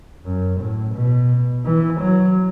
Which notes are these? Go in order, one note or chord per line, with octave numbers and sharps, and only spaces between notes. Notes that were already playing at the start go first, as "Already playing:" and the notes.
F#2
A2
B2
E3
F#3